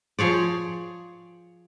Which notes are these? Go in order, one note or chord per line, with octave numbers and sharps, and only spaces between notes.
F3 G#4 C#5 D5